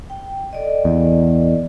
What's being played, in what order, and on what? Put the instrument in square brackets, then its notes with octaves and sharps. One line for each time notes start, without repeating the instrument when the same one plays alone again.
[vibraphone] G5
A4 D5 D#5
[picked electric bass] E2